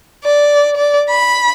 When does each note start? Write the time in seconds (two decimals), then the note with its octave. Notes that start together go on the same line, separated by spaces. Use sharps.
0.24 D5
0.77 D5
1.09 B5